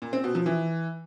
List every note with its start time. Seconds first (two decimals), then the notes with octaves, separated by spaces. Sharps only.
0.02 A#2
0.13 C4
0.24 B2
0.35 F3
0.46 E3